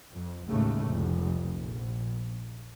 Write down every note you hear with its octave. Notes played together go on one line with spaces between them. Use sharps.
F2
A1 D#2 A2 C#3 G#3 A3
F1 C2
A#1